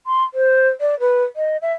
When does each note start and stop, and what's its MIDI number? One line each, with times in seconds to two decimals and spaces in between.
0.07 0.24 84
0.34 0.68 72
0.81 0.98 74
1.00 1.23 71
1.36 1.57 75
1.62 1.73 76